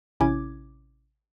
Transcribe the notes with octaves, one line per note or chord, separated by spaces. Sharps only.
A1 C3 C#4 E4 D6 G#6